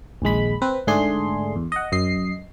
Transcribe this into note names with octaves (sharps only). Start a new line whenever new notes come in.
A#1 D#2 G#3 B5
C4 B4
G#2 D3 A3 D4 G#4 C6
E2
D#5 F#5
F#2 D#5 C7